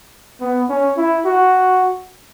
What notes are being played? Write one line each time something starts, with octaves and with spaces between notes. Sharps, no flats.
B3
C#4
E4
F#4